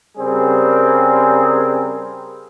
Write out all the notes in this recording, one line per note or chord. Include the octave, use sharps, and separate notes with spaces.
C#3 G3 C4 G#4 A#4